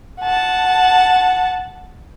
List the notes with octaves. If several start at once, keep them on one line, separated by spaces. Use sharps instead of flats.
F#5 A5